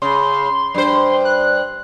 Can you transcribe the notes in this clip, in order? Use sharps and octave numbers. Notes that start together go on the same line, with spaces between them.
C#3 C6
G2 C5
F#6